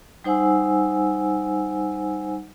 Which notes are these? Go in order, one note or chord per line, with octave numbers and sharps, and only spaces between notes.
G3 D#4 C5 F#5 G#5 E6